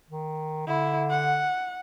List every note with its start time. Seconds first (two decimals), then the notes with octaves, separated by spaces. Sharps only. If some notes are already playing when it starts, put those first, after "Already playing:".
0.10 D#3
0.67 D3 E4
1.10 F#5